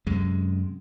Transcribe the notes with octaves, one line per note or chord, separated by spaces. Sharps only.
F#2 C3 G#3